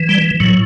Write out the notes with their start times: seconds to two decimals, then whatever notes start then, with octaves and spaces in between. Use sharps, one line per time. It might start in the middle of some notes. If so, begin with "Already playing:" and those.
Already playing: E3
0.09 G3
0.40 A2 F#3